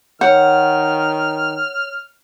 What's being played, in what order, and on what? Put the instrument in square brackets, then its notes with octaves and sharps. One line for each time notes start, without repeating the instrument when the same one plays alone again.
[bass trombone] D#3 [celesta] C#5 G6 [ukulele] F#5 [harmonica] F6